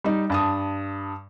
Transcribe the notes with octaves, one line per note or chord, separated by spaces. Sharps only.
G3 D#4
G2 A5 D#6